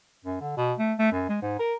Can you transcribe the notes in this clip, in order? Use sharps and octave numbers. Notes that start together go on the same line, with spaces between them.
F#2
D3
B2
A3
A3
F#2
G#3
G#2
A#4